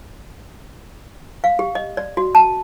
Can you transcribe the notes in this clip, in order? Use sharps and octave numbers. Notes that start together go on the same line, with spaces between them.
F5
G4
D#5
D5
F#4
A5